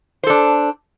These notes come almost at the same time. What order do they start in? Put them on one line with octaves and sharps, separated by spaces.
C5 A4 D4